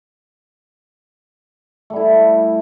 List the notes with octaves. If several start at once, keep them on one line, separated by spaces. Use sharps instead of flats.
G3 A3 E4